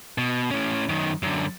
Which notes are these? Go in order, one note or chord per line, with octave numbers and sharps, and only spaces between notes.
B2
A2 C#4
F#2 D#3
F#2 D3